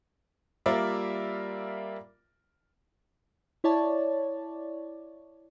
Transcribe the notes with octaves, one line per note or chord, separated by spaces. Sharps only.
G3 A#3 F4 A#4 D5 E5
E4 C#5 D5 A5